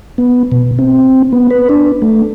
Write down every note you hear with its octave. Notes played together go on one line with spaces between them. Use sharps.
B3
B2
C4
B3
B4
D4
A3